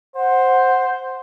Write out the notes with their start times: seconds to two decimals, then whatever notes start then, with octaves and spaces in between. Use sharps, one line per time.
0.16 C5 F#5